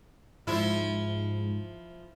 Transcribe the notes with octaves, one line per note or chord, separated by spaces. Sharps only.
G#2 F3 E4 F4